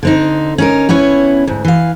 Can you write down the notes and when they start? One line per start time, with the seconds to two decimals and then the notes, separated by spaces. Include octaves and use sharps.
0.03 D3 C4 D#4
0.58 C#4 D#4 A#4
0.89 B3 C#4 E4 C#5
1.47 D2 G#2
1.65 E3 F5